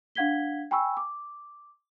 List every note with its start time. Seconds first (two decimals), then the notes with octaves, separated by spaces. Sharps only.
0.15 D4 F5 F#5 G#6 B6 G7
0.71 G5 G#5 B5 C#6 E6
0.97 D6